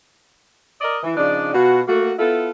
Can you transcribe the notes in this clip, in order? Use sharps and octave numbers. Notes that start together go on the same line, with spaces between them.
A#4 D5 D#5
E3
C#3 F3 D4 D#4 D5
B2 F4 F#4
A3 A#3 F#4
B3 E4 F4 A4